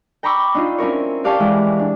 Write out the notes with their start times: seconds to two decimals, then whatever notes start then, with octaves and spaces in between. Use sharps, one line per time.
0.23 G5 A#5 B5 C#6 D6 E6
0.55 D4 D#4 F4
0.78 C4 C#4 E4 A#4 C#5
1.24 G4 D5 F5 G5 A5 C#6
1.39 E3 G#3 E4
1.79 D4